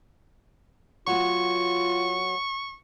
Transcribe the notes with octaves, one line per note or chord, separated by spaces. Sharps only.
F#3 B3 F4 C#6